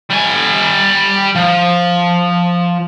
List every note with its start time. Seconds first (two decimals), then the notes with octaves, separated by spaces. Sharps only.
0.10 G3 G#5
1.35 F3